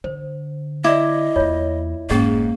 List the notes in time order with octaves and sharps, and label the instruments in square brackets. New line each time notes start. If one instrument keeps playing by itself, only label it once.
[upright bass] D3 [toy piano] C5
[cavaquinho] E4 [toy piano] D5 D6 [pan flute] D#5
[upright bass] E2 A#3 [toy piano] F4 C#5
[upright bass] F1 G#2 [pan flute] A#3 [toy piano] C#4 G#4 D#5